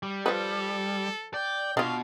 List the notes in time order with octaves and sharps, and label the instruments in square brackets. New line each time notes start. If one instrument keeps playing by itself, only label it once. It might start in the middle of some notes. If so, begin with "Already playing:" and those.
[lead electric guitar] G3
[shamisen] F3 B4 [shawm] A4
[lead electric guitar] D5 [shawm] G5
[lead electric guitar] B2 [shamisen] D4 F4 [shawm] F5